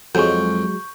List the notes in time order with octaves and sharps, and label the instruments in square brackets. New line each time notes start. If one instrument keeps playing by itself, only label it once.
[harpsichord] F2 [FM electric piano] F#3 G#3 [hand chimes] C#6 G6